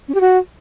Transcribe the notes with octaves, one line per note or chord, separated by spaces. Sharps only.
C#4
G4
F#4